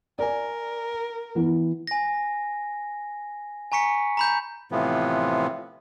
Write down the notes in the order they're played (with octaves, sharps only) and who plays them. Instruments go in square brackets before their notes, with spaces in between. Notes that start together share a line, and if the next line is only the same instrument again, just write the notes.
[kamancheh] A#4 [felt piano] D5 G#5
[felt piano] E3 B3 E4
[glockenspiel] G#5 A#6
G#5 A#5 C#6 B6 C#7
A#5 B5 G6
[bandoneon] A2 C3 E3 F3 B3